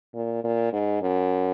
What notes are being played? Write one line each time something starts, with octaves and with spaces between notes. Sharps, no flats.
A#2
A#2
G#2
F#2